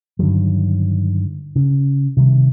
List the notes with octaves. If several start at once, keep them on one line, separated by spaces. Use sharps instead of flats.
G2 D3 D#3 F#3
C#3
C3 D#3 G3